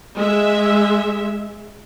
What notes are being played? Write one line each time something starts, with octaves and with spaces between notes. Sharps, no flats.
G#3 E5